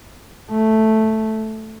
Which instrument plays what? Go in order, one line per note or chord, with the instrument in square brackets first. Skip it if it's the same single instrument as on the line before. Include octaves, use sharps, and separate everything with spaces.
[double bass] A3